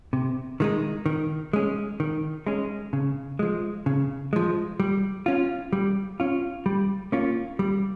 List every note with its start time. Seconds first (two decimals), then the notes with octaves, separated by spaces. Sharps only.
0.13 C3
0.60 D#3 G#3 D#4
1.06 D#3
1.53 G#3 C#4
2.00 D#3
2.47 G#3 C#4
2.93 C#3
3.39 F3 G#3
3.86 C#3
4.33 F3 G#3
4.80 G3
5.26 C#4 F4
5.73 G3
6.20 C#4 F4
6.66 G3
7.12 A#3 C#4 F4
7.59 G3